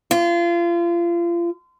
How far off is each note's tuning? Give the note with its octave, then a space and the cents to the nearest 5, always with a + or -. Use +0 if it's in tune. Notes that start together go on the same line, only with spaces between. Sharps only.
F4 -30